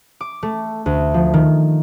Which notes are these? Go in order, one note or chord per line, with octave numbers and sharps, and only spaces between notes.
D6
A3
D2
F3
D#3